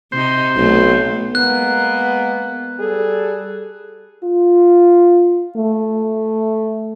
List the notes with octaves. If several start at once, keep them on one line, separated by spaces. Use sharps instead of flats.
C3 D#4 C5
B1 A3 B3
G#3 A#3 B3 F#6
G3 G#4 A4
F4
A3